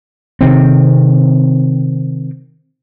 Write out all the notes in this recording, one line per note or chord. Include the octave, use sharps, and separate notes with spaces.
C3 D#3 C4